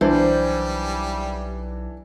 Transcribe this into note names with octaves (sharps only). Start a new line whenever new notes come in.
B1 E3 G3 D4 C5